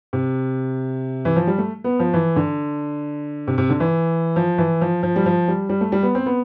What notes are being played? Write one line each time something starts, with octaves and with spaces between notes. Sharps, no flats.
C3
E3
F3
G3
A3
B3
F3
E3
D3
C3
C3
D3
E3
F3
E3
F3
F3
G3
F3
G3
G3
A3
G3
B3
C4
B3